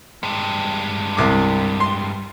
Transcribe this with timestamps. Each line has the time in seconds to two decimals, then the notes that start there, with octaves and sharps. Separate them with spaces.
0.23 G2 G#3
1.17 C2 D6
1.80 C6